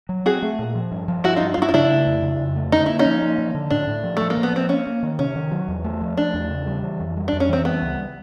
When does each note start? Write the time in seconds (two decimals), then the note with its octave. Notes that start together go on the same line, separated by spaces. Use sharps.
0.09 F#3
0.26 C4 F#4 G#4
0.43 A3
0.59 A#2
0.75 F3
0.92 G2
1.08 F3
1.24 G2 E4 F#4
1.36 G2 D#4 F4
1.54 F4
1.58 G2 E4 F#4
1.69 F4
1.74 C#3 D4 E4
1.90 A3
2.07 F2
2.23 C#3
2.39 F2
2.56 A3
2.72 D3 D#4
2.86 A#3 E4
2.99 C#4 D#4
3.06 F3
3.22 A#3
3.38 F3
3.55 D3
3.70 A2 D4
3.87 A2
4.04 F3
4.17 F3 A3
4.30 A#3
4.37 F3
4.43 B3
4.53 A#3 C4
4.69 A#3 C#4
4.87 A#3
5.03 D#3
5.19 C3 C#4
5.36 D#3
5.51 F#3
5.68 E2
5.84 A3
6.02 F3
6.17 A3 D4
6.34 E2
6.50 C#3
6.67 G3
6.83 E3
7.00 F2
7.17 G3
7.28 D4
7.33 F2
7.40 C#4
7.49 E3 C4
7.65 G3 B3
7.82 C#2